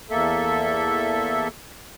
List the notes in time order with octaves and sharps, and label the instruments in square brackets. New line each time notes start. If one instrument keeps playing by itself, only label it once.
[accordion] E2 A#3 A4 E5